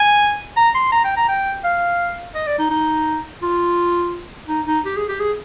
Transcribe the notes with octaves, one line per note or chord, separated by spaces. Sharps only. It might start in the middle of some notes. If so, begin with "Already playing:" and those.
Already playing: G#5
A#5
C6
A#5
G5
A#5
G5
F5
D#5
D5
D#4
D#4
F4
D#4
D#4
G4
G#4
G4
G#4